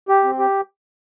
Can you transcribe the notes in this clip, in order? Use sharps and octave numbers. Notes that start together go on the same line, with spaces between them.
G4
C4
G4